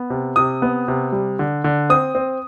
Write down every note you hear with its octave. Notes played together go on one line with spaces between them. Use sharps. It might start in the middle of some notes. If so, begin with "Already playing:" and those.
Already playing: B3
C3
C3 D#6
B3
C3
G3
D3
D3
C4 D#6
C4